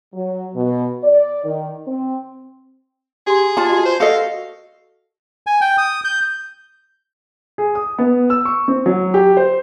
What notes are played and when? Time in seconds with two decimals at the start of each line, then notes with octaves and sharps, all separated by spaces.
0.14 F#3
0.55 B2
1.03 D5
1.44 D#3
1.87 C4
3.27 G4 G#4 C6
3.57 F4 A5
3.69 F#4 D#5
3.86 C5
4.00 F#4 A4 A#4 D#5 F5 C#6
5.47 G#5
5.61 G5
5.78 D#6
6.04 G6
7.58 G#4
7.75 D#6
7.98 B3
8.30 E6
8.45 C#6
8.68 C4
8.86 F#3
9.14 G4
9.37 C5